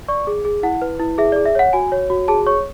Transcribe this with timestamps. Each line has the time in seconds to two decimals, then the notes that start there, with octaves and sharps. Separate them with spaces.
0.08 D5 C#6
0.27 G#4
0.45 G#4
0.63 E4 F#5
0.82 B4
1.00 E4
1.18 G#4 E5
1.32 D5
1.36 G#4
1.45 E5
1.55 C#5 F#5
1.73 F#4 G#5
1.92 C#5
2.10 F#4
2.28 G#4 A5
2.47 C#5 C#6